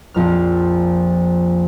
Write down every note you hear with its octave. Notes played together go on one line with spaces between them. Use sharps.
A#1 F2 F6